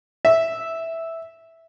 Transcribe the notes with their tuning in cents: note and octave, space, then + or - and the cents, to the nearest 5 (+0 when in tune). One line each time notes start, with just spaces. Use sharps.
E5 -5